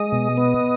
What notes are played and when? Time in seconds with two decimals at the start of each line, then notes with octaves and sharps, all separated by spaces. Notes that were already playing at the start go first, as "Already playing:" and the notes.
Already playing: G#3 D#5
0.12 B2
0.37 B3